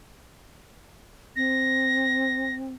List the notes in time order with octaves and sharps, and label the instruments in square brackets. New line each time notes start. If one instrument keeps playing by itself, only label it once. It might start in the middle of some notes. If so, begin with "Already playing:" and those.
[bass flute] C4 [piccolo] A#6